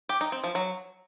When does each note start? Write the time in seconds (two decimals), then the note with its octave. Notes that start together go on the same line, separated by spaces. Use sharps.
0.09 G4
0.21 D#4
0.32 C4
0.44 F3
0.55 F#3